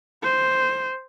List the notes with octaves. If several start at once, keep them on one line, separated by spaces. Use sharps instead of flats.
C5